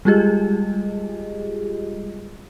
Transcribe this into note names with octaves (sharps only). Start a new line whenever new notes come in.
G3 G#3 F4 G4 G#4 D#5